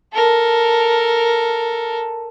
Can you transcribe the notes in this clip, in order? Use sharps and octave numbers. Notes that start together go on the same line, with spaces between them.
A4 A#4